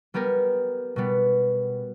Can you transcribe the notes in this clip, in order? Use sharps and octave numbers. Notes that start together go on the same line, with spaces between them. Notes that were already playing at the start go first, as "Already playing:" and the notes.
G3 B3 G4 A#4
B2 G3 B3